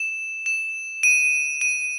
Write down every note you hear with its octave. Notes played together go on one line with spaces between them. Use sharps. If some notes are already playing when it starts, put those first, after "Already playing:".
Already playing: E7
E7
D#7
D#7